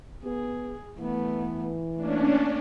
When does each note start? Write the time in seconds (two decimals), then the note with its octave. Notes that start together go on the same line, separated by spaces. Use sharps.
0.24 B3 G#4
0.98 E3 A3 B3
1.97 A3 A#3 C#4 D4